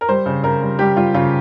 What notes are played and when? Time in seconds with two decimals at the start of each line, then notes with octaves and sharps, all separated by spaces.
0.01 A#4
0.08 G3 C5
0.26 C#3
0.43 C#3 A#4
0.61 G3
0.79 G3 G4
0.96 G3 F4
1.14 C#3 F4